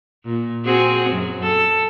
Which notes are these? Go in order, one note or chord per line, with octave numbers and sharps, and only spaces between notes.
A#2
C4 F#4 G#4
F#2
A4